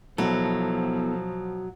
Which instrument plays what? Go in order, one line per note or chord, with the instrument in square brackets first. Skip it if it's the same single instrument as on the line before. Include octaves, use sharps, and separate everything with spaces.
[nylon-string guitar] B2 F#3 [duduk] F3 [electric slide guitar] B3 E4 A4